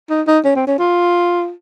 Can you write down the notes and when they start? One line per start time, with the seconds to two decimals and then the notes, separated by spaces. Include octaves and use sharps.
0.10 D#4
0.27 D#4
0.45 C#4
0.56 C4
0.67 C#4
0.79 F4